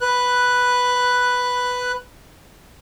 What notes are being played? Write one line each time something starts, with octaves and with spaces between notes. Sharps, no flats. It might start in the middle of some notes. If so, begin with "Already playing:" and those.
B4 F#6